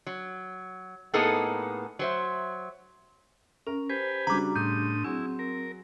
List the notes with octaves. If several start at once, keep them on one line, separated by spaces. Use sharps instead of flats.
F#3
A2 A#3 B3 D#4 G#4 A4
F#3 C5 E5
C#4 A#4
G4 B4 C5 G#5
C#3 G3 D4 F#4 A#5 D6
A2 D4 C6 D#6 G6
F#3 C4 E4 F#4 G#4
A#4